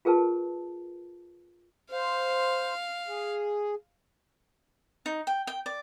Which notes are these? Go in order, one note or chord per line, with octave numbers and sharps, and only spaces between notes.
F4 G#4 A#4 B4 A5
C5 F5
G#4
D#4
G5
G5
D5